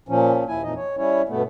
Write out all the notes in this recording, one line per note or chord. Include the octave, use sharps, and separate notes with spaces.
A#2 F3 C#4
D#2 E4 G#5
F2 A#2 E3 F3 D#4 D#5
C#5
G3 C#4 E4 C#5
G2 B2 A3 B3